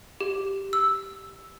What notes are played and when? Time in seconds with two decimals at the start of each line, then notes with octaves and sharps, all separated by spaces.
0.21 G4
0.73 E6